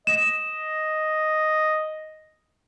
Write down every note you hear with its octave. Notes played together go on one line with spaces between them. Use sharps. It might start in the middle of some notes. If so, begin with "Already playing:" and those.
D#5 E7